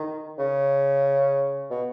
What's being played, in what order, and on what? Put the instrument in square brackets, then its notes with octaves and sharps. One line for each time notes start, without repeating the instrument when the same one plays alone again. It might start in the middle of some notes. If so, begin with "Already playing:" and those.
Already playing: [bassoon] D#3
C#3
B2